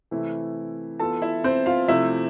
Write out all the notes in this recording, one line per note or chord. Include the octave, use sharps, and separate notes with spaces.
C3 E3 A3 C4 E4
E3 B3 F4 A4 A5
E4 E5
C4 C5
F4 F5
C3 F3 A3 C4 E4 E5